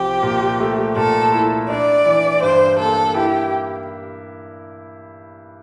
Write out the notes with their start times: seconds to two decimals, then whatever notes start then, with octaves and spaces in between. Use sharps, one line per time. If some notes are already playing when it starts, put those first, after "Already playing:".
Already playing: C2 F3 G4
0.23 A#2
0.60 A3
0.96 A#2 A4
1.33 E4
1.70 D4 D5
2.06 E3
2.43 G2 C5
2.79 A#3 A4
3.15 E4 G4